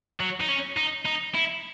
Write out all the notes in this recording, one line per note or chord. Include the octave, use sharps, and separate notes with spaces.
F#3
D#4
C#4
D#4
D#4
E4